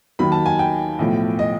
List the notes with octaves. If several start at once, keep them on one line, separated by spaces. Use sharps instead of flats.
D#2 D#3 F#3 B5
A5
G#5
G5
B1 A2 F3
D#5